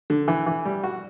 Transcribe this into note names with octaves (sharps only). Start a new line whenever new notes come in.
D3
E3
E3
G3
F#4